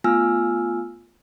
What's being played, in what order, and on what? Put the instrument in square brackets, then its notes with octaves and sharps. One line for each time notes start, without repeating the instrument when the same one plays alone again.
[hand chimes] A3 B3 F4 G#5 E6 F6